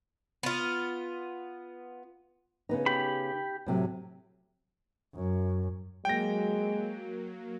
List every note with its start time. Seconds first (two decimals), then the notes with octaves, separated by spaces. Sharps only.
0.43 B3 F4
2.69 C#3 B3 D#4
2.86 G4 B5
3.66 A2 C3 F#3
5.15 F#2
6.05 F#3 G#3 A#3 G5 A#6